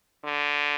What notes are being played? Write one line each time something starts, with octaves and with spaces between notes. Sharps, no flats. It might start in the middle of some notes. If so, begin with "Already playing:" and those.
D3